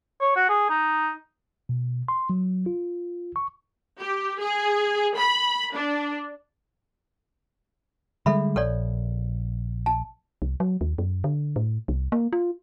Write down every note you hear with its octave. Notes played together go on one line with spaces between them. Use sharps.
C#5
F#4
G#4
D#4
B2
C6
F#3
F4
C#6
G4
G#4
B5
D4
D3 G3 G#3 A4 E5 B5
A#1 A4 C#5 D5
A5
C2
F#3
D#2
F#2
D3
A2
C2
A#3
F4